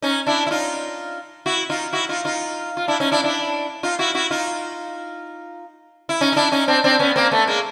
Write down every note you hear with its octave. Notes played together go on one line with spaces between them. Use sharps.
C#4 D#4
D4 E4
E4
D#4 F4
E4 F#4
D#4 F4
E4 F#4
D#4 F4
D#4 F4
F4
D4 E4
C#4 D#4
D4 E4
D4 E4
D#4 F4
E4 F#4
E4 F#4
D#4 F4
E4
C#4 D#4
D#4
D4 E4
C#4 D#4
C4 D4
C4 D4
B3 C#4
A#3 C4
A3 B3
G#3 A#3